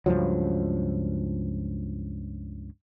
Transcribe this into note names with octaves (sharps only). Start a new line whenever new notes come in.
C#2 G2 F3 F#3